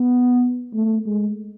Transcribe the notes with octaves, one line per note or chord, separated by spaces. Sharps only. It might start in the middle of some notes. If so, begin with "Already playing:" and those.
Already playing: B3
A3
G#3